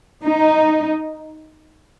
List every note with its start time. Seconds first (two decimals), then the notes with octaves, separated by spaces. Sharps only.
0.23 D#4